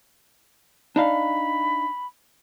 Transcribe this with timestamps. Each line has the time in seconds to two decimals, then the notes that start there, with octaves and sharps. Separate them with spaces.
0.96 D4 D#4 F5 B5